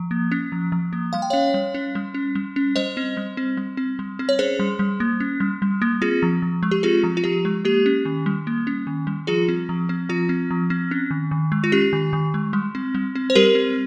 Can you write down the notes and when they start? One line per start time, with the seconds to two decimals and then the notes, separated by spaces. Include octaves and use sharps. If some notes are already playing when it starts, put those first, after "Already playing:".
Already playing: F3
0.11 A#3
0.32 C#4
0.52 F3
0.72 F3
0.93 A#3
1.13 G3 F5
1.22 G5
1.30 C#4 C#5 F5
1.54 G3
1.74 C#4
1.95 G3
2.14 C#4
2.35 G3
2.56 C#4
2.76 G3 C5 D#5
2.97 C4
3.17 G3
3.37 C4
3.57 G3
3.77 C4
3.99 G3
4.19 C4
4.29 C#5
4.39 C#4 G#4 C5
4.59 G3
4.79 G3
5.00 A#3
5.20 C#4
5.40 G3
5.62 G3
5.82 A#3
6.02 C4 F4 G#4
6.22 F3
6.42 F3
6.63 G#3
6.71 G4
6.83 C4 F4 G#4
7.04 F3
7.17 F4
7.24 F3 G4
7.45 G#3
7.65 A#3 G4
7.86 C#4
8.05 D#3
8.26 G3
8.47 A#3
8.67 C#4
8.87 D#3
9.07 G3
9.27 F3 F4 G#4
9.49 C4
9.69 F3
9.89 C4
10.09 F3 F4
10.29 C4
10.51 F3
10.70 C4
10.91 C#4
11.11 D#3
11.31 D#3
11.52 G#3
11.64 F4
11.72 C#4 G4
11.93 D#3
12.13 D#3
12.34 G#3
12.53 G3
12.75 C4
12.95 G3
13.15 C4
13.30 C5
13.35 G3 G4 A#4
13.55 C4